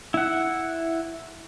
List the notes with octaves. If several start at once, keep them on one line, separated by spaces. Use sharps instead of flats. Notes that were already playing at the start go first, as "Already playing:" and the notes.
E4 F#5